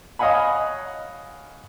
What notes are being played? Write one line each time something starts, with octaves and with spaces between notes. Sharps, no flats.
C#5 D#5 F5 F#5 G#5 B5